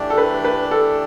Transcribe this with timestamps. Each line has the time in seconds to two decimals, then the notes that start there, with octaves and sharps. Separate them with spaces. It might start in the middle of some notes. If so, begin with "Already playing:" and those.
Already playing: E3 A3 D4 G4 D5
0.10 A4
0.18 B4
0.45 B4
0.71 A4